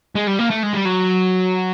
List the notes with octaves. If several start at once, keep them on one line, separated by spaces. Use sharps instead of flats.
G#3
G3
A#3
A3
G#3
G3
F#3